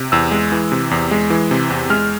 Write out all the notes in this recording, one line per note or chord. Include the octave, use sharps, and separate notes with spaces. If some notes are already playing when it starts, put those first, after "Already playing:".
Already playing: C3
E2 E6
G#3
E3
C3
E2
G#3
E3
C3
E2
G#3 F6